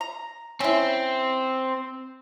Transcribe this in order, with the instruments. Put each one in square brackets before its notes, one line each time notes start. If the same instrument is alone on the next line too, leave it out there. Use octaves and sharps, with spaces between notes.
[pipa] A#5
[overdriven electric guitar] C4 [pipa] C#4 E4